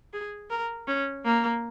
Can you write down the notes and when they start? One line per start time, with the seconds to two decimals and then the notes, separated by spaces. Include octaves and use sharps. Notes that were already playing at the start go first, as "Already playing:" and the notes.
0.13 G#4
0.50 A#4
0.87 C#4
1.25 A#3